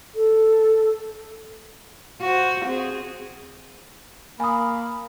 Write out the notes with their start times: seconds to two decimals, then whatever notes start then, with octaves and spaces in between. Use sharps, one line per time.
0.15 A4
2.21 F#4 C5
2.65 C4 G#4
4.40 A#3 G#5 B5 D#6